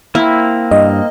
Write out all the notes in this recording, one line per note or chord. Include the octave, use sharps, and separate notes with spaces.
A#3 C4 E4
G2 D#5